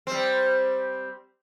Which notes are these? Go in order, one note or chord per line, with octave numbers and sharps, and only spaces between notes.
G3 C4